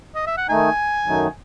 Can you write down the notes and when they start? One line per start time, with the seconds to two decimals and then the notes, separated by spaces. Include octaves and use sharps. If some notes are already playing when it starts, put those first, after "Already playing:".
0.15 D#5
0.27 E5
0.38 F#5
0.49 D#3 A3 D#4 G#5
1.06 F#2 D#3 F#3 A3 D#4